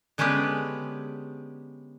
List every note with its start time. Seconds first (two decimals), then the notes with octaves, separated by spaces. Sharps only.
0.18 D3 G#3 B3 C#4 G4 B4